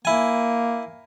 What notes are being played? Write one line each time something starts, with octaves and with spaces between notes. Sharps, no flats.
A#3 E4 G#5